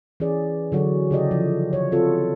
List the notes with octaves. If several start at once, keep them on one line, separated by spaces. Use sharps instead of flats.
E3 C#4 G#4 D5
D3 F#3 F#4
C#3 E4 G4 A4 D5 D#5
F3
C#5
C4 F4 F#4 A4 C5